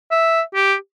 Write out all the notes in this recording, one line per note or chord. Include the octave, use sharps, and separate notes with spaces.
E5
G4